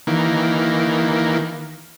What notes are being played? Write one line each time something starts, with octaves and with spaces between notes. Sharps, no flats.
D#3 E3 A#3